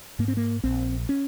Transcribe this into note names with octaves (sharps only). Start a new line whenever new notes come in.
G#2 A#3
C4
A#3
A#1 C4
C#4